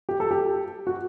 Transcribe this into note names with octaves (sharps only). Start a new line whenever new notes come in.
G4
A4
G4
F#4